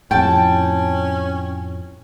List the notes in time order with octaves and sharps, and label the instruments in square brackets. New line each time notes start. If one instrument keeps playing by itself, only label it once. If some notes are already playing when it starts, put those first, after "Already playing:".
[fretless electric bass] F2 A2 [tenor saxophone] C#4 [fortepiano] G5 [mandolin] A5